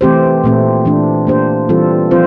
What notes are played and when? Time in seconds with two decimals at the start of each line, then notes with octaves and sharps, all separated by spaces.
0.01 E3 A3 C4 G4 C5
0.44 A#2 A3 C4
0.85 E3 A3 D4
1.27 A#3 D4 G4 C5
1.69 E3 G3 C4 F4 A4
2.11 F3 C4 F4 C5